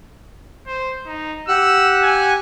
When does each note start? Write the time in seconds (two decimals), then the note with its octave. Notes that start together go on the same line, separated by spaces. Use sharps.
0.67 C5
1.06 D#4
1.48 G4 F#5 E6 F#6
2.03 G#5